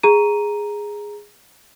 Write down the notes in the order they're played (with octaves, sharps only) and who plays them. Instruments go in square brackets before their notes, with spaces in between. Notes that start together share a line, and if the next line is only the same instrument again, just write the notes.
[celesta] G#4 A#5 D#7